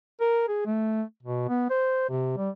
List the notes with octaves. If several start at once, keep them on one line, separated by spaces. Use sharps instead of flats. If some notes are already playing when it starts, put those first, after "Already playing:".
A#4
G#4
A3
B2
B3
C5
C3
G3